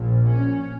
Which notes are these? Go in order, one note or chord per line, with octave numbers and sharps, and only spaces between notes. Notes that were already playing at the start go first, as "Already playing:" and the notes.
Already playing: A#1 A#2
C#4